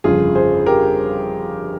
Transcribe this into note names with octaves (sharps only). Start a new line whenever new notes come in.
G1 F2 C#3 F4 G#4
G#4 C5
G4 A#4